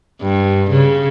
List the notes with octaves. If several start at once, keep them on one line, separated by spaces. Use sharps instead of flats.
G2
C#3